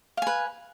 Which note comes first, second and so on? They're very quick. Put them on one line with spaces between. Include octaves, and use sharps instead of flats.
F5 G#5 B4